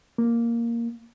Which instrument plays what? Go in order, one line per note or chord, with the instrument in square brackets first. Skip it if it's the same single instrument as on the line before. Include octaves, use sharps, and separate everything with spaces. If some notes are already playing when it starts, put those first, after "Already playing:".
[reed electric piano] A#3